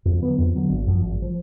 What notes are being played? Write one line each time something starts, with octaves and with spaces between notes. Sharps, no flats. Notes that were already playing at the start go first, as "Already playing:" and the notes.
F2
D3 F#3 B3
F2
D3 F#3 B3
G#1
F#2 F3
G#1
F3